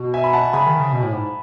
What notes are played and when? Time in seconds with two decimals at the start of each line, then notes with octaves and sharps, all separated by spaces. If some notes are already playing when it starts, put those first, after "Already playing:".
Already playing: B2
0.14 E5 G#5
0.24 B5
0.33 F#5 A5
0.53 C#3 G#5 B5
0.66 D#3
0.79 C#3
0.92 B2
1.03 A2
1.12 G#2